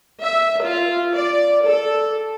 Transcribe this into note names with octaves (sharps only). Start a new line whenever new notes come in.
E5
F4
D5
A4